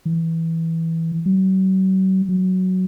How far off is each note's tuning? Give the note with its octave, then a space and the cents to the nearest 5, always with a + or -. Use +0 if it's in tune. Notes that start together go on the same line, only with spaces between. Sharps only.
E3 -10
F#3 +40
F#3 +5